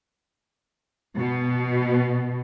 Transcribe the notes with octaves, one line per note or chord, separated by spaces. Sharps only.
B2